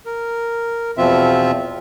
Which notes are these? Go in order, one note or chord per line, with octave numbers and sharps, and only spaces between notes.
A#4
E2 B2 F3 C4 F4 E5